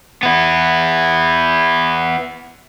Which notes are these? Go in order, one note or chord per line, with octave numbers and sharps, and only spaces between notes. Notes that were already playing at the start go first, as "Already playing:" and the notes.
B3 E4